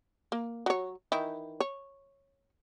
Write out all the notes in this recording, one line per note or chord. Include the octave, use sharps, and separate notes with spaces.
A#3
F#3 C#5
D#3 E3 E4
C#5